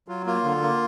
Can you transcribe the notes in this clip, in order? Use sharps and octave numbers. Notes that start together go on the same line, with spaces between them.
F#3 F4
A#3 F4
D3
A#3